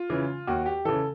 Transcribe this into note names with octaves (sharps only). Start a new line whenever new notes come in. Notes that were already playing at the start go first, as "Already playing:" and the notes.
Already playing: F4
C#3 E3
D#2 F#4
G4
C#3 E3 A4